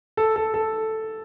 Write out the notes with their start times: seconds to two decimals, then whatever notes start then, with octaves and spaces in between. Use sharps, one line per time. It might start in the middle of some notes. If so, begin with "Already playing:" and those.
0.17 A4
0.36 A4
0.54 A4